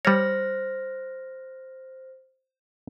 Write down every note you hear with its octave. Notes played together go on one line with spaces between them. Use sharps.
G3 C5 C#5 F6 A#6